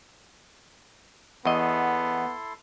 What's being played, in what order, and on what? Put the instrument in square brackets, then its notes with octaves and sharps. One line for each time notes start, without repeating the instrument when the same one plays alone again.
[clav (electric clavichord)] E2 D#5 [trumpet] B3 [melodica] E4 A4 C6